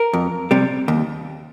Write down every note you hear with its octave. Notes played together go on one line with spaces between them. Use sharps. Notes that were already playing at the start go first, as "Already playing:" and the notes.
Already playing: A#4
F2
C3 G3
D#2